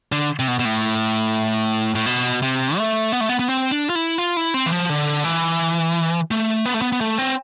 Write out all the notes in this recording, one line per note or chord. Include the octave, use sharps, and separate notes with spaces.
D3
C3
B2
B2
A2
A2
B2
C3
A3
B3
A3
B3
B3
C4
D4
F4
E4
F4
E4
C4
E3
F3
D3
E3
A3
B3
A3
B3
B3
A3
C4